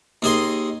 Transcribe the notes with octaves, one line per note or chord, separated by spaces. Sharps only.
D#2 G#4 D#5 C6